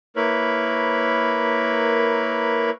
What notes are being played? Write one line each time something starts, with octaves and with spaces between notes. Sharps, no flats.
A#3 E4 A#4 B4 C#5 B5